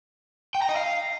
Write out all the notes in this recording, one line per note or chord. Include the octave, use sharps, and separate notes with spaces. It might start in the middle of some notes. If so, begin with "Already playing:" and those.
G5
A#5
D#5
F5